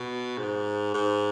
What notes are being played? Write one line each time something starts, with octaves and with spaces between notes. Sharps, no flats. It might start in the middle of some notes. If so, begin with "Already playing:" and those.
Already playing: B2
G#2
G#2